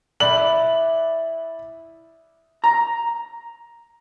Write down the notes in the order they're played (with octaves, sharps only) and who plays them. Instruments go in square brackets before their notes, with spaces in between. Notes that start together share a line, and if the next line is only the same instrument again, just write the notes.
[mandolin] E4 [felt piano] D5 B5 F#6 [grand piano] F#7
[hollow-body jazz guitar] A#5